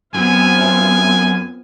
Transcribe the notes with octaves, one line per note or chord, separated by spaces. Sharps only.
F#2 B3 C4 F4 G#5